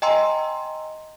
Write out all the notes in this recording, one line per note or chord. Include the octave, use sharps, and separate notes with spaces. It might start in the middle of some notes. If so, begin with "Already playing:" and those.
D#5 G5 G#5 A#5 C6 E6